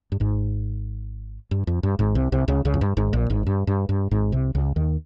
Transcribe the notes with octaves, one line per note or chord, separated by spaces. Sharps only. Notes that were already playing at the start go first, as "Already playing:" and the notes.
G2
G#1 G#2
G2
F2
G2
G#1 G#2
C2 C3
C2 C3
C#2 C#3
C#2 C#3
F2
G2
G#1 G#2
A#1 A#2
G#1 G#2
G2
G2
G2
G#1 G#2
C2 C3
C#2 C#3
D#2 D#3